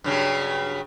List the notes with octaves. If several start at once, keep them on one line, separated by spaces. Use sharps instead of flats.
G2 C#3 F#3